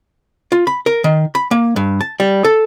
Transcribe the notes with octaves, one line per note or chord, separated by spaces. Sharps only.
F4
B5
A#4
D#3
B5
A#3
G2
A5
G3
A4